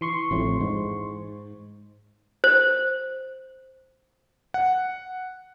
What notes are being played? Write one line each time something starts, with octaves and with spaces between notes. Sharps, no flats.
E3 C6 C#6
A1 F2 A2
G#2
C5
F#5